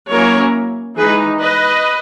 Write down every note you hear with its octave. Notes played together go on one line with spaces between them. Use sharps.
F#3 A#3 C#4 E4 A#4 C#5
E3 G#3 D#4 G#4 B4
B4 D#5